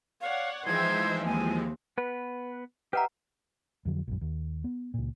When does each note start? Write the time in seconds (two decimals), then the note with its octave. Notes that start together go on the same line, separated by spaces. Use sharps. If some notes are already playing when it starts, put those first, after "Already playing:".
0.21 C#5 D5 F5 F#5
0.66 E3 F3 G#3 D#4 C5 E5 G5 G#6
1.25 D#2 C4 G#5
1.98 B3 B4
2.93 G4 B4 D#5 E5 F#5 A#5
3.85 F2 D3 F#3
4.07 A#1 F#2
4.21 D#2
4.64 B3
4.94 C#2 A#2